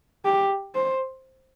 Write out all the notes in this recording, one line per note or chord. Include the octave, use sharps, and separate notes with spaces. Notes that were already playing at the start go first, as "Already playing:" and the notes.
G4
C5